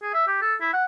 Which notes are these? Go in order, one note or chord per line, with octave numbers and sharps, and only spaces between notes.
G#4
E5
G4
A4
E4
F#5